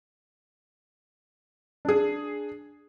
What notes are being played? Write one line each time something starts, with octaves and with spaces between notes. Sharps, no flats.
D4 G#4